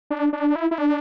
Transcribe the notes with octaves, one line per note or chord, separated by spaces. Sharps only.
D4
D4
E4
E4
D4